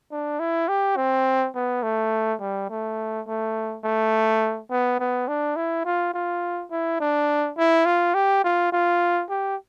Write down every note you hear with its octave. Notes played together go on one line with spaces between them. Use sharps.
D4
E4
G4
C4
B3
A3
G3
A3
A3
A3
B3
B3
D4
E4
F4
F4
E4
D4
E4
F4
G4
F4
F4
G4